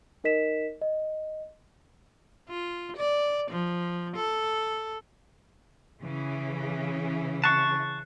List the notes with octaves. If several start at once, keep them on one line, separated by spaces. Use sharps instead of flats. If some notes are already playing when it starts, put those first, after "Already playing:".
D#4 A#4 D#5 B6 E7
D#5
F4
D5
F3
A4
C#3 E3
A5 C#6 F#6 C7 C#7